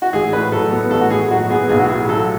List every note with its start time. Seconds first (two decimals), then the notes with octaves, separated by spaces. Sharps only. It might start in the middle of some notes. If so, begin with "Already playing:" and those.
0.02 F#4
0.13 A1 G#4
0.32 A2 B4
0.52 F#3 A4
0.71 B3
0.91 A1 A4
1.01 F#4
1.10 A2 G#4
1.31 F#3 F#4
1.50 B3 G#4
1.69 B1 G#4
1.79 F#4
1.89 A2 G#4
2.09 F#3 A4